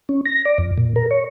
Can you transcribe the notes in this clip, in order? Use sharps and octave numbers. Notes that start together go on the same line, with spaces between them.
C#4
A#6
D5
F2
A#2
A#4
C#5